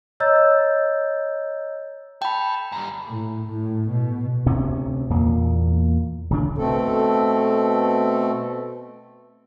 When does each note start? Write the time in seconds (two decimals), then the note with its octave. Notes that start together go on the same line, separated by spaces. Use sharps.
0.20 C#5 D#5 A#5 E6 G6 A6
2.22 A4 G5 B5
2.72 F#2 G3
3.07 A2
3.47 A2
3.90 B2
4.46 D2 C3 C#4
5.10 E2 A#2 A#3
6.30 D1 C#3 D4
6.56 B2 A3 C4 A4